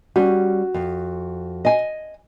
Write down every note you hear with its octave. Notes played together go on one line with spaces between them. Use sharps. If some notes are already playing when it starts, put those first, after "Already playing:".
G3 C#4 F#4
F2
D#5 G#5